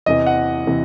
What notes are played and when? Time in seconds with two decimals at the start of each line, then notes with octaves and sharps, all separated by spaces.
0.06 E2 C3 E3 D#5
0.26 F#5
0.67 C3 E3